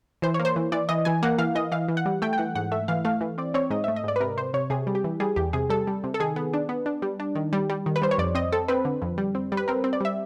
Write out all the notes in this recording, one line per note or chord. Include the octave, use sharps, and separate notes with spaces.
E3 C5
C#5
A#3
C5
E3
E3 D5
E3 D#5
E3 G#5
A#3 F#5
E3 F5
E3 D#5
E3 F5
E3
F#5
G3
A3 G5
G5
E3 F#5
G#2 F#5
A3 E5
E3 F5
A3 F5
E3
C4 D5
C4 C#5
G#2 D#5
E5
A3
D#5
G#2 D5
B4
C3 A#4
C3 C5
C3 C#5
C3 G#4
G3
G4
E3
G3 G#4
E2 G4
C3 G#4
G3 A4
G3
C3
A4
D#3 G#4
B3
D4
B3
D4
G3
D4
D#3
G3
G3
D#3
B4
G3 C5
C#5
F2 D5
C4 D#5
C4 A4
C4 B4
D3
F2
G3
C4
G3
B4
C4 A#4
C4
D5
G3 E5